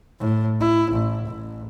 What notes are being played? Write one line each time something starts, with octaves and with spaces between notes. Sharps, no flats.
A2
E4
A1
A1